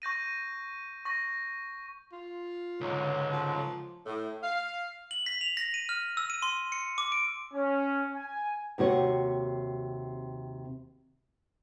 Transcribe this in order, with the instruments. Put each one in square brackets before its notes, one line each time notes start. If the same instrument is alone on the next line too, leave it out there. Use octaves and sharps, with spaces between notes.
[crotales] C#6 G6 A#6 D#7
C#6 A#6
[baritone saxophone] F4
[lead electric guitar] C#2 [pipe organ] G#2 D3 F#3 [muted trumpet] C#5
[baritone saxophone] F3
[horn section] A2
F5
[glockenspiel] F#7
B6
F7
A#6
D#7
F6
E6
D#7
C6
C#7
D6
D7
[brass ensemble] C#4
G#5
[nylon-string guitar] D#2 C3 F#4 C#5